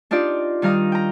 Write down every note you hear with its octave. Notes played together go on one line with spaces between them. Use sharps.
D4 D#4 F4 G4 D5
D#3 G3 F5 A#5 D#6
G5 A#5